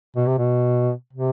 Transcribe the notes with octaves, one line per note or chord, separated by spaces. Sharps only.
B2
C3
B2
C3